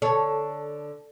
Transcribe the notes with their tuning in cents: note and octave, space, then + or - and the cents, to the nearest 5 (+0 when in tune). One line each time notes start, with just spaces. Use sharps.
D3 +5 A4 +0 C#5 +0